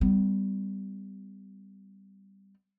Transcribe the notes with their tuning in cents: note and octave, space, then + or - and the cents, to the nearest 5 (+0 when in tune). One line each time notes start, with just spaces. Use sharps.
G3 +0 B3 +40